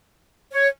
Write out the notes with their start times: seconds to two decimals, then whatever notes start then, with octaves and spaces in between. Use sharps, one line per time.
0.51 C#5